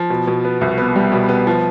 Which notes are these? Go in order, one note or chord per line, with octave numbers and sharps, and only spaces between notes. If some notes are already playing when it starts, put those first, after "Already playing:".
Already playing: F3
B2
B2
B3
C2
B3
G3
B2
B3
F3